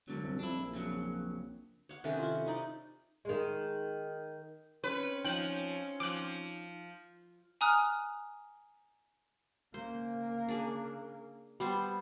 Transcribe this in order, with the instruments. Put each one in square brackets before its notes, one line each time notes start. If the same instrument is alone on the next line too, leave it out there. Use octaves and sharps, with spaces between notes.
[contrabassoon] E1 [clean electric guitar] F#2 D3 F#3
[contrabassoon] C2
[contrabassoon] F2 [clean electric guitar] D4 E4
[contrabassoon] A#1
[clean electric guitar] F2 C#3 F#3
[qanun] C#5 F#5
[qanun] C3 D#3 C#4 [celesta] A4 E5 F#6
[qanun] E4 F4
C4 D#4 D5
[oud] D#3 G#3
[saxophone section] C4 C#4 [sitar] B4
[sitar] F3 [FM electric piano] D#4 [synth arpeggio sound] G5 F#6
[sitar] F3 [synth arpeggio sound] D6 F#6
[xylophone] G#5 A#5 D#6 F6 F#6
[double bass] C#3 A#3 [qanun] C5
[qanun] D4 G#4
G3 B3 C5